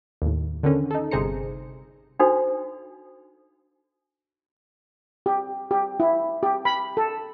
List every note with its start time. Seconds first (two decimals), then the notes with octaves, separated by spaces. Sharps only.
0.22 D#2 A2
0.63 D3 D#3 C#4
0.91 D#4 A4
1.11 G1 C3 G#4 C5 A#5 C#7
2.20 D4 D#4 F#4 A4 C5
5.26 G4
5.71 G4
6.00 E4
6.43 G4
6.65 B5
6.97 A4